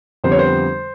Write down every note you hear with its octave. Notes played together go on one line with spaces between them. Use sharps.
F2 D3 G3 B3 C5
C#5
C5